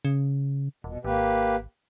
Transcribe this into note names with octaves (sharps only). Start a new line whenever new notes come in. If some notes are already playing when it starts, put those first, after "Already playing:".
C#3
D#1 B2
G#1 A#3 G4 B4